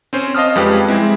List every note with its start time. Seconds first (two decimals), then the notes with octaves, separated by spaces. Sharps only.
0.13 C4 C#4 C5
0.35 D#5 F5 A5 D#6 F6
0.56 F2 G3 G#3 G4 B4
0.88 G#3 C4 E4